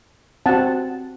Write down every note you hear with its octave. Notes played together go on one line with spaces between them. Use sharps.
C4 F#4 F#5 A5